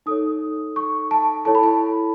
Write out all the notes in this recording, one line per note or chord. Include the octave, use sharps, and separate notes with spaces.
D#4 A4 C#5 D#6
C#6
A5
E4 A4 C#5 A5
B5
A5